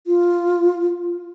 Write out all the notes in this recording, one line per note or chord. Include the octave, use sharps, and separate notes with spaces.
F4